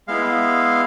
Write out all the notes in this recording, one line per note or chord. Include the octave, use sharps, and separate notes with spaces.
G#3 B3 E4 F5